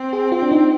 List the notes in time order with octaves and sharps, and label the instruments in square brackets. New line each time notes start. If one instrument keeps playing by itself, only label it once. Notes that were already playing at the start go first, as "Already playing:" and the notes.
Already playing: [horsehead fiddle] C4
[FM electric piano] G#4
F4
D4
D#4